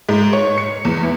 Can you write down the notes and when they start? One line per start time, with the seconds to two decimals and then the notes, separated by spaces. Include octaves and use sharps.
0.09 G#2
0.33 C#5
0.58 C#7
0.85 E2
1.03 E3